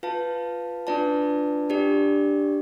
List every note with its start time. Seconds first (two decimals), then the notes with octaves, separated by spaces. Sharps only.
0.03 F4 B4 F5 A5
0.87 D4 F4 B4 D5 A5
1.70 D4 G4 D5